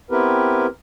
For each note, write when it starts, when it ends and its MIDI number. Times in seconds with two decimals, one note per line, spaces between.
0.11 0.66 59
0.11 0.66 60
0.11 0.66 64
0.11 0.66 67
0.11 0.66 70
0.11 0.66 71